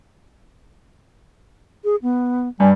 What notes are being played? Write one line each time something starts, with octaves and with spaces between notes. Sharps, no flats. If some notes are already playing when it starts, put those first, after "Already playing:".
G#4
B3
G2 G3 G#5